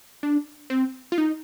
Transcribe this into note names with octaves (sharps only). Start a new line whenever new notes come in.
D4
C4
F4
D#4